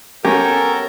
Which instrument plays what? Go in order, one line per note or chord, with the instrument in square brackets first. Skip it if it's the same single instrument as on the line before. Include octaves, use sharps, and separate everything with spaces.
[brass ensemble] B3 A4 [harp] C#4 [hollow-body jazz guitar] G4 G5 G#5 [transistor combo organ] A#4